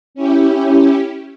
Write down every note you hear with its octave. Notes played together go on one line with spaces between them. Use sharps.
C#4 E4 G4